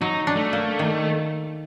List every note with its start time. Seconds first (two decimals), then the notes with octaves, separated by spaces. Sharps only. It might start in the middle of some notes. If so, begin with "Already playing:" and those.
0.01 F#3 D#4
0.27 D4
0.36 A3
0.53 A#3
0.79 D#3